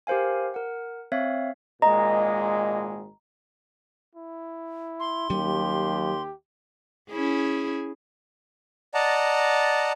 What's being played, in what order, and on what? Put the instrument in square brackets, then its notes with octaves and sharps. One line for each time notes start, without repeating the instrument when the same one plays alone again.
[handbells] G4 A#4 C5 F5 G#5
A#4 F#5
C4 C#5 E5 F5
[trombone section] G#1 A#2 G#3 [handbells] D#5 [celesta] A#5
[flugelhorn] E4
[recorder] C6
[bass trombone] D#2 [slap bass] F#3 G3 C#4 [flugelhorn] G4
[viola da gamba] C#4 E4 G#4
[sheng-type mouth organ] D5 D#5 F#5 A5 A#5